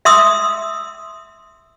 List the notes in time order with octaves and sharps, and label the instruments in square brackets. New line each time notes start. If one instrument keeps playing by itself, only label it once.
[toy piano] E5 C6 D#6 E6